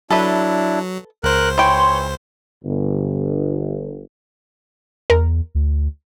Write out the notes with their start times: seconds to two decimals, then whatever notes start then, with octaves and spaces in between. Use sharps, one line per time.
0.11 F#3 D4 E4 A4 B4 E5
1.24 C#2 A#4 C5 F#6
1.58 E3 C#5 G5 C6
2.64 G1
5.10 E2 A#4
5.55 D2